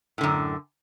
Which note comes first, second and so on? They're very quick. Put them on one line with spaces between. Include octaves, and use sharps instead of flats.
A2 D3 F#2